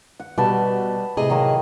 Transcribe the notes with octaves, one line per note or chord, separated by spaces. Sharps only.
F#5
B2 G3 B4 A5
A2 C3 G#4 D#5
D#3 F#3 A#3